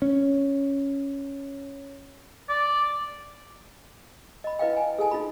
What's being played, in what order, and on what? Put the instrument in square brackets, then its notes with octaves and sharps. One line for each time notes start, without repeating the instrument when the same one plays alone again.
[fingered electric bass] C#4
[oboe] D5
[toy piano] D#5 B5
E4 B4 D#5 F5 G5
G5 G#5
G#4 A4 G#5 A5
D#4 F4 B5